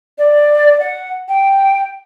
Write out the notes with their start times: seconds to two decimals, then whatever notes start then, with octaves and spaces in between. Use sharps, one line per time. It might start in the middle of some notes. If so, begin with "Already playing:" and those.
0.18 D5
0.80 F#5
1.28 G5